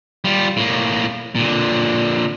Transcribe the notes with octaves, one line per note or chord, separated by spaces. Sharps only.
G3 F4
A2 A#3
A#2 D3